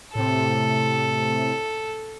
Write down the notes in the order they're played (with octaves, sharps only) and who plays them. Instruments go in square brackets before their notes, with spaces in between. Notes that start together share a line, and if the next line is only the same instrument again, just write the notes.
[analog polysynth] A2 C3 [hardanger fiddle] A4